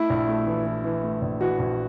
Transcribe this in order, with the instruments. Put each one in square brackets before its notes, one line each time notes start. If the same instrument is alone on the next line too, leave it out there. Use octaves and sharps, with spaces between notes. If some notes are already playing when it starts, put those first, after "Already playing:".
Already playing: [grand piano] A3 [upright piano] E4
[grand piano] A#1
A3
E3
E3
E3
A3
A#1
[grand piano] E3 [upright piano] F#4
[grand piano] A#1